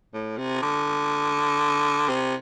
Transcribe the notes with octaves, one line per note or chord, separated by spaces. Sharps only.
A2
C3
D3
C3